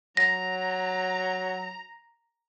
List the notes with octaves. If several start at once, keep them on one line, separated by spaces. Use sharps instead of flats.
F#3 A#5 A#6